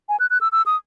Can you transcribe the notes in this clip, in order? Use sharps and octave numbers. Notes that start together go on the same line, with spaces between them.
G#5
F#6
F#6
E6
E6
D#6